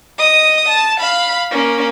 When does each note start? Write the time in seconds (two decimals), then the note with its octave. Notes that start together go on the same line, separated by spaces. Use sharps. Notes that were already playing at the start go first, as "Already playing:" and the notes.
0.19 D#5 D#6
0.69 A5
1.00 F5 B5
1.51 A#3 C#4